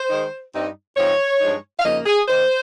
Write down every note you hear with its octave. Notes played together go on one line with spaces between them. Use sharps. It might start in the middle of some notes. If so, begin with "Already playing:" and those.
Already playing: C5
D#3 G#3 D#4
G2 G3 C4 D#4
G#2 F3 C4 D#4 C#5
G2 F3 G#3 D#4
F5
F2 C#3 F3 A#3 D#4 D#5
G#4
D#3 A#3 D#4 C5